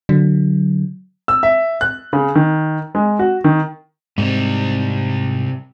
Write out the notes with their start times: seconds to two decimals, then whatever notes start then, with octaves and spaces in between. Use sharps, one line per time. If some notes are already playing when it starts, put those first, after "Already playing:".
0.09 D3 F#3
1.28 E6
1.43 E5
1.81 F#6
2.13 C#3
2.35 D#3
2.95 G#3
3.19 F#4
3.44 D#3
4.18 G#2 C3 G3